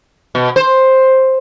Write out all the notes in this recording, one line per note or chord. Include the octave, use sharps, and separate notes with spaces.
B2
C5